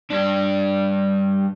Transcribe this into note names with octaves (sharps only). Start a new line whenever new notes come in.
G2 D4